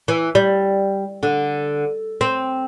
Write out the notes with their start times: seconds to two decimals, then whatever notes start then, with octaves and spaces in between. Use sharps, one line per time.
0.08 E3
0.35 G3
1.23 D3
2.21 C4